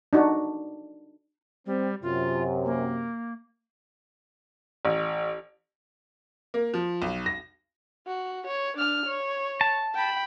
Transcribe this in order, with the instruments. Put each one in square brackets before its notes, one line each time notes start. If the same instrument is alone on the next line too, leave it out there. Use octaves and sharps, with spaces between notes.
[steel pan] D4 D#4 F#4
[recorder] G3 [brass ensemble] C4
[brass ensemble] F#2 C3 [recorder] F4
[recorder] A#3
[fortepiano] A1
[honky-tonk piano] A#3
F3
B1
A#6
[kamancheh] F#4
C#5
D4 F6
C#5
[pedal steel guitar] A5
[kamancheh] G5 B5